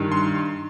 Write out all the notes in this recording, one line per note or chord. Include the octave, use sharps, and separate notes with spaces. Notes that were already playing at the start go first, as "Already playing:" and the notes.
Already playing: G2 D#3 G3
C6